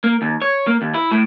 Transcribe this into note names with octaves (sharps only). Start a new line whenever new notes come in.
A#3
D#2
C#5
A#3
D#2
E4
A2